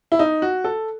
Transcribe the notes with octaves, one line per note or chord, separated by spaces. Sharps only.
E4
D#4
F#4
A4